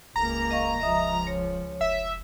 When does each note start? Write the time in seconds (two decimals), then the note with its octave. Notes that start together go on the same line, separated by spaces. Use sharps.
0.16 D#1 C#2 A#3 A#5
0.51 D#5 F5 C#6
0.80 C#2 F3 D#5 E5 D#6
1.27 C#5
1.81 F1 E5